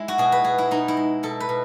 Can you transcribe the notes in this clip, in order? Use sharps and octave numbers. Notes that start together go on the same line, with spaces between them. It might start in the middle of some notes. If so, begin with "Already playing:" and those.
Already playing: G#3 E4
F#4
B2 G#4
B4
B2 G#4
E4
B2 D#4
E4
G#3
B2 A4
B4
B2